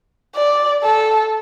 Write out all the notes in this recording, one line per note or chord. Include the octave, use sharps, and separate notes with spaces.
D5
A4